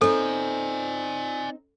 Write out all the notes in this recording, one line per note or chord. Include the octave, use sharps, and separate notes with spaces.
C4 D#4 A4 D5 G#5